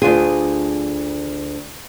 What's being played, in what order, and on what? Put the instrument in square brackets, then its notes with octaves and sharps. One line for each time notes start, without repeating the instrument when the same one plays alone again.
[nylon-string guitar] D2 D4 F4 G#4